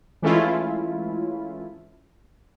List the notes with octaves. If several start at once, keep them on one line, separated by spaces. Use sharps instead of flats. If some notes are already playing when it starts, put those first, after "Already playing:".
E3 G#3 A3 C#4 E4 F4